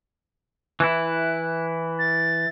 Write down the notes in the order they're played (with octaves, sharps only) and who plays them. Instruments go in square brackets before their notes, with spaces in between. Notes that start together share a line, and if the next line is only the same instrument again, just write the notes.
[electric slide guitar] E3 E4 [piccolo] F#6
[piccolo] A6